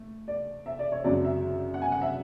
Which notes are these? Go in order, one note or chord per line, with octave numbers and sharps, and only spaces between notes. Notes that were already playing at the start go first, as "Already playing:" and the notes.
Already playing: A3
D5
E5
D5
C#5
G#1 F#2 C#3 F#3 D5
E5
F#5
G#5
F#5
E5